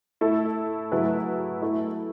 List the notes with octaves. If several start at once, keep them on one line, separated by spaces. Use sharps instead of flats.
A3 E4 A4
F#3 A3 E4 G#4 B4
A3 E4 A4